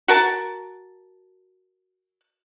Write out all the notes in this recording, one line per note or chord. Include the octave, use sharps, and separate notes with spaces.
F#4 A#4 A5